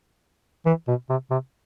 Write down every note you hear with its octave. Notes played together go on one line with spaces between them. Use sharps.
E3
B2
C3
C3